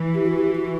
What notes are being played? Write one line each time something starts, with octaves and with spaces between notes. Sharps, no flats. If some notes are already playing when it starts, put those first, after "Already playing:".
Already playing: E3
G4
F#4
G4
F#4